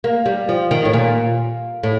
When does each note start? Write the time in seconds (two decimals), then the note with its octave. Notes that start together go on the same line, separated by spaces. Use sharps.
0.04 A#3
0.26 G3
0.49 F3
0.71 D#3
0.85 A2
0.93 A#2
1.83 A2